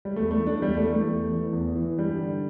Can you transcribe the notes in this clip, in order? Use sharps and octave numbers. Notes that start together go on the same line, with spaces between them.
G3
E2 A3
A3
E3
D4
E2 G3
A3
E3
A3
E2
E3
E2
E3
G2 G3
D3